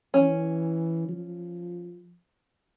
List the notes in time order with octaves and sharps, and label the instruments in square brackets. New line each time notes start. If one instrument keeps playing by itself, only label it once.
[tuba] E3 [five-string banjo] C#4
[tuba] F3